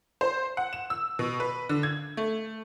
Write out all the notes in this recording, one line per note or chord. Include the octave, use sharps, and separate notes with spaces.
C5
F#5
E7
E6
B2
B4
D3
G#6
A3